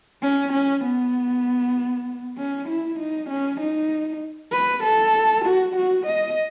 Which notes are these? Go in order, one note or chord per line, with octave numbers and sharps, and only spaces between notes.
C#4
C#4
B3
C#4
E4
D#4
C#4
D#4
B4
A4
F#4
F#4
D#5